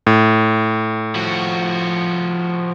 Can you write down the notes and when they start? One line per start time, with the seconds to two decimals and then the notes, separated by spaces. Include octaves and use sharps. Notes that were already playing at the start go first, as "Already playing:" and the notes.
0.07 A2
1.15 F3 F#4